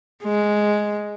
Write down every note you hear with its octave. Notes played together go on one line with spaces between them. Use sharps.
G#3